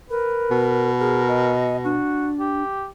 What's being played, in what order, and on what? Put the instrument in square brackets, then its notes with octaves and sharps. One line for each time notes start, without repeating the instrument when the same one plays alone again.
[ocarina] A#4 [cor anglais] B4
[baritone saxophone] B2
[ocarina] G#4 [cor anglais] A#4
[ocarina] D#5
[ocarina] D4 [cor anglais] F#4
[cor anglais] G4